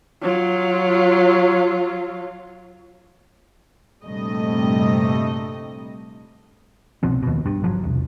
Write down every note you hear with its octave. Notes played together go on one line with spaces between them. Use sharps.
F#3 F4
A#1 G2 C3 G3 A3 D#5
C2 B2 F3 C4
D#2 B2
G2
G#1 F3 F#3
E1 C2